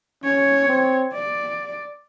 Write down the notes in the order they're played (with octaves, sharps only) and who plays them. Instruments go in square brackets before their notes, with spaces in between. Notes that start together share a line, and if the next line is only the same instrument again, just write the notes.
[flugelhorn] C#4 [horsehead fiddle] C#5
[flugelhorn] C4
[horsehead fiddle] D5